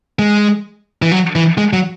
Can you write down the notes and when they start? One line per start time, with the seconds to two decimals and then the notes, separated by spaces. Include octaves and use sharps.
0.19 G#3
1.02 E3
1.11 F#3
1.35 E3
1.58 G#3
1.73 F#3